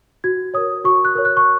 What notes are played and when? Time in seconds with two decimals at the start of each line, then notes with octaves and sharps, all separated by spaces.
0.24 F#4 G#6
0.54 A#4 C#5 D#6
0.84 F#4 C#6
1.05 F#6
1.15 A#4 C#5
1.25 F#6
1.37 C#6